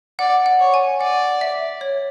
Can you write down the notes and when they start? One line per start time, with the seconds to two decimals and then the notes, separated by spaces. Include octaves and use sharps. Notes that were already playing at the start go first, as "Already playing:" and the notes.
0.19 D5 F#5
0.46 F#5
0.60 C#5
0.74 G#5
1.00 D5 F#5
1.41 E5
1.81 C#5